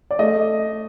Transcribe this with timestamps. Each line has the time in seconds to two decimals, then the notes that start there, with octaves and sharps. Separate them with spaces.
0.11 D5
0.19 A3 D#5